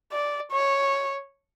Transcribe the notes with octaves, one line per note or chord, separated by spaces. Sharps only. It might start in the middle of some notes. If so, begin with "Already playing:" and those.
D5
C#5